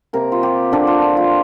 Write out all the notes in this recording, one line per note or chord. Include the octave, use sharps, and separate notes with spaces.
C3 A#3 A#4
F4
G4
D3 F3 C4 D4
F4
D4
F4